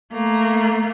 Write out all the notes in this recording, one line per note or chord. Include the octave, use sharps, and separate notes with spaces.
A3 A#3